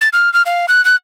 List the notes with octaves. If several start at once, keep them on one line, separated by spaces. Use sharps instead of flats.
A6
F6
F6
F5
F#6
F#6